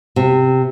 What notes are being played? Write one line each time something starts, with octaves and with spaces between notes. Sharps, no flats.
C3